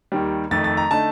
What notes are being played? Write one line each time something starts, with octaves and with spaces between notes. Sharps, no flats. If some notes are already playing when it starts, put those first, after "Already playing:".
D#2 D#3 G3
F2 D#3 A3 A6
A6
A#5
D3 A3 D#4 A5